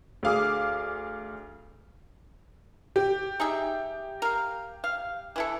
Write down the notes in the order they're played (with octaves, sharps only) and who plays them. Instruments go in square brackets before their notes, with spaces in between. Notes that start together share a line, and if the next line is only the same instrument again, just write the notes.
[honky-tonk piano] D2 G#4 F5 D6 D#6
G4
[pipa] D#4 G#4 E5
A#4 F5
F5
E3 E4 A4